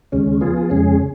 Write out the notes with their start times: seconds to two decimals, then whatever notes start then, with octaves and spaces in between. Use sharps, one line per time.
0.12 D#2 C#3 G#3 C#4
0.41 F3 B3 F4 G#4
0.70 F2 C#3 G#3 C#4 G#4